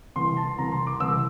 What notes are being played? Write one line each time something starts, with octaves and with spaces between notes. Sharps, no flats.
C2 C3 E3 C6
A5
C2 C3 E3 A#5
C6
D6
C2 C3 E3 E6